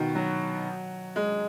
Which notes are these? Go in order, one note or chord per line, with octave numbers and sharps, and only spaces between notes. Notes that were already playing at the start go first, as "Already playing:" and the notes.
Already playing: B2 D#3
F#3
G#3